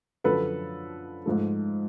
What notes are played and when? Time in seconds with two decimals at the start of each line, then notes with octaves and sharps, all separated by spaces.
0.24 F#2 D3 F3 A4 B4
1.26 G#2 F3 A3